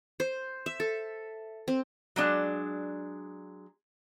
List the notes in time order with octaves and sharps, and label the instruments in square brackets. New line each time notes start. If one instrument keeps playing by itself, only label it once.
[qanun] C5
E5
A4
C4
[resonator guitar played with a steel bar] F#3 G#3 D4